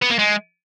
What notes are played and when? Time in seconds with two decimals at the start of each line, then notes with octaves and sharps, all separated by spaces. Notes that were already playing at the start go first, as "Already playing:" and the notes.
0.02 B3
0.10 A#3
0.19 G#3